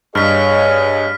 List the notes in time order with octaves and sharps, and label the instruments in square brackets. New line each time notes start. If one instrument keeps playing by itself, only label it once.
[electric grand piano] G2 [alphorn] G#4 [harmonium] C#5 D#5 F5 [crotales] F6 B6